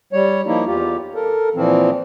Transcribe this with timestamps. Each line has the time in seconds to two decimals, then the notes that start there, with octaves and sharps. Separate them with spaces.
0.13 G3 C#5
0.47 F3 A#3 D#4 E4
0.67 E2 F4 G4
1.15 A4 A#4
1.56 A#2 E3 F3 C4